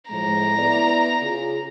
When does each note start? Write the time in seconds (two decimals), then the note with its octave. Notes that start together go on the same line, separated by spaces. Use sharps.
0.10 A2 F3 G#3 A#5
0.57 B3 E4 D5
1.22 C#3 F4 G#4